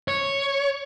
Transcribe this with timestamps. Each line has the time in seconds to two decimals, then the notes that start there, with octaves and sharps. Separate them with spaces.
0.08 C#5